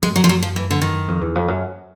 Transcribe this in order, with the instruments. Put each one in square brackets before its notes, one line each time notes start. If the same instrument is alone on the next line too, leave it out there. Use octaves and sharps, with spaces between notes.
[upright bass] F#2 [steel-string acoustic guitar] G#3
[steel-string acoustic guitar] F#3
F3
F#3
F3
E3
D3
D#3
[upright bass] F2
E2
F2
F#2